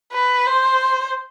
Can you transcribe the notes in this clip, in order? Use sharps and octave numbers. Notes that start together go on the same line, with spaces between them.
B4
C5